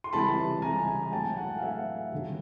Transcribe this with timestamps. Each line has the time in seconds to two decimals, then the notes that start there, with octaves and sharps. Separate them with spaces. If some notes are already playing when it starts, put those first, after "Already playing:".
0.04 C6
0.13 C#2 C3 E3 G3 A5 B5
0.62 C#2 C3 E3 G3 G#5 A#5
1.03 G#5
1.12 A2 F#3 G5 A5
1.37 F#5 G#5
1.58 F5
1.62 A2 F#3 E5 F#5
2.12 G2 D#3 F#3